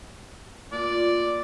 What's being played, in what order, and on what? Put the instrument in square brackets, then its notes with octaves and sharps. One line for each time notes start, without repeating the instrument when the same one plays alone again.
[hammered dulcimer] A#2 [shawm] D5